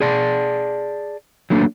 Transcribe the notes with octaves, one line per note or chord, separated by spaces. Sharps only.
G#4 D5 A5
F#3 A3 A#3 D4